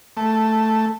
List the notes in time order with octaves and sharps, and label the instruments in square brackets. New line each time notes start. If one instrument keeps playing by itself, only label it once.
[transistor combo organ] A3